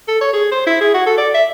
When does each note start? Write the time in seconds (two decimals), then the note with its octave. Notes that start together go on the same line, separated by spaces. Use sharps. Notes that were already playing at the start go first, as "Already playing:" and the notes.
0.08 A4
0.21 C#5
0.33 G#4
0.52 C5
0.67 E4
0.81 G#4
0.94 F#4
1.06 A4
1.18 D5
1.34 E5